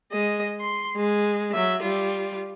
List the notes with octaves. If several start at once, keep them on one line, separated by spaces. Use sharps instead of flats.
G#3 D#5
C6
G#3
F#3 E5
G3 F4